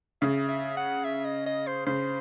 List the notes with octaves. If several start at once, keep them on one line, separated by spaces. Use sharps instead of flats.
C#3 E5
E5
F#5
E5
D#5
D#5
C5
C#3 C5